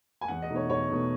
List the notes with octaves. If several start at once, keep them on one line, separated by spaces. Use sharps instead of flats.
G#5
E2 F#5
D#5
B2 A3 D#4
C#5
E2 C#5
B2 A3 D#4